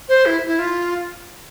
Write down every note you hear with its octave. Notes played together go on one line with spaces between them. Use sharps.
C5
E4
E4
F4